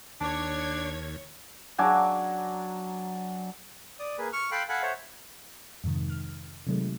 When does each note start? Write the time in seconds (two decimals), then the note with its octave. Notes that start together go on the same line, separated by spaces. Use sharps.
0.21 D#2 D4 C#5 A5 D6 G#6
1.78 F#3 D4 G#5 D6
3.99 D5 D#6
4.18 A#3 G#4 B4
4.33 C#6 F6
4.52 A4 F5 G5 B5 C6 F#6
4.69 A4 F5 F#5 G#5 B5 F#6
4.82 A4 C5 C#5 E5 F#5
5.84 F2 G#2 C3 D#3
6.10 F6
6.67 C3 D#3 F#3 G#3 A3